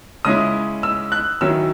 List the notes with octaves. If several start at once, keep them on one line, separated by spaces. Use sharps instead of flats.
C#3 G#3 C#4 E4 D#6
E6
F#6
D#3 F#3 C#4 E4 E6